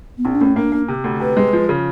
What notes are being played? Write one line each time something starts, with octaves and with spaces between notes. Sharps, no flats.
B3
A#1 C4
D4
A2 C#4
A#3 D4
A#3
C3
D2
C3 B4
G#3
F3
C#3